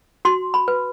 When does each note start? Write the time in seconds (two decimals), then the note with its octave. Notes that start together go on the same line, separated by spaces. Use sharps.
0.25 F#4 C6
0.54 B5
0.68 B4